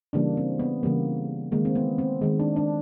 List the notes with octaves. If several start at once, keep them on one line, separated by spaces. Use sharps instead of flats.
C#3 E3 G3 A#3 D4
C4
B3
C#3 E3 G3 A#3
D#3 G#3 A#3
C4
B3
C4
D#3 G#3
D4
D4